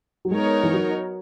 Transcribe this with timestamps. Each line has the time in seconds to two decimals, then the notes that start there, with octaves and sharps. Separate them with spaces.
0.25 F#3
0.31 G#3 B3 D#4 A#4 C#5
0.63 E3
0.74 F#3